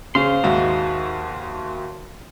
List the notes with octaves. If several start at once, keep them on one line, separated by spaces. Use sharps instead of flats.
C#3 C5 F5 C6
D#2 G#2 F#4 E5